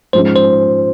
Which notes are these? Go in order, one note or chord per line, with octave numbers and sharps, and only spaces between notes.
G#2 F3 G#3 C#4 C5
C5